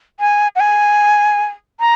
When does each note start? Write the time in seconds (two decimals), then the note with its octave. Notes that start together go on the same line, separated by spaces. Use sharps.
0.20 G#5
0.56 F#5
0.60 G#5
1.80 A#5